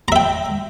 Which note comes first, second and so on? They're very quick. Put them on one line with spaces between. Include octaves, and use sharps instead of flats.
A#5 E5 G5